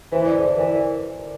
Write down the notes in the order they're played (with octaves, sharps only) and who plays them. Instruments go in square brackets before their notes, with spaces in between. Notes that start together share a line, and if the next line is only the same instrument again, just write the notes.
[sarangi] E3 [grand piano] C5
[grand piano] D5
A4 C5
[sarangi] E3 [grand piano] A#4 D5